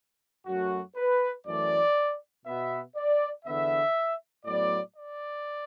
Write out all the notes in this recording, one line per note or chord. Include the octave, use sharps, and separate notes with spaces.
F#2 F#3 A3 F#4
B4
F#2 E3 A3 D5
B2 B3 E5
D5
E2 D3 B3 E5
A2 F#3 B3 D5
D5